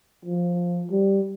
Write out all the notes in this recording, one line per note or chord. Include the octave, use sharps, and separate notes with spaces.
F3
G3